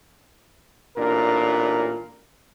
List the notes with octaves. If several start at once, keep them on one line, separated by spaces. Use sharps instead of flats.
A1 A#2 D4 A#4